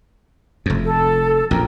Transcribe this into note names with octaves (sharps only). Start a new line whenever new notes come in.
F1 F2
A4
A#1 F2 A#4 G5